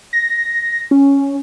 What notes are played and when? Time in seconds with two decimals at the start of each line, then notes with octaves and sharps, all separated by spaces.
0.13 A#6
0.91 C#4